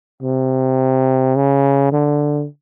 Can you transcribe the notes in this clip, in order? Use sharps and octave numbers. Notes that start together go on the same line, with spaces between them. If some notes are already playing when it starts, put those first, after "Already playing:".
C3
C#3
D3